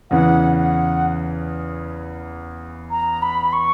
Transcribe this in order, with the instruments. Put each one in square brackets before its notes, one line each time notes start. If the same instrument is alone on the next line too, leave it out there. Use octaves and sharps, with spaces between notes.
[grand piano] E2 C#3 E3 [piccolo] F#5
[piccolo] F#5
A#5
B5
C#6